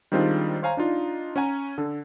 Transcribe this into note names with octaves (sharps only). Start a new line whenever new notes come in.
D#3 G3 G#3 C4 D4 F4
C5 C#5 F5 G#5 A#5
D4 D#4 F4
C#4 C#5 F#5 G#5 A#5
D3 A4